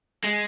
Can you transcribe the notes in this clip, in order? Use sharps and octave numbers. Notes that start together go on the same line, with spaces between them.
G#3